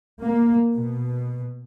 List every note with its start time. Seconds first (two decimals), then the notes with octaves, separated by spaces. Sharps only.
0.21 A#3
0.75 B2